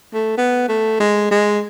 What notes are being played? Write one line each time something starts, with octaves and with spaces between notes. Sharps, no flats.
A3
B3
A3
G#3
G#3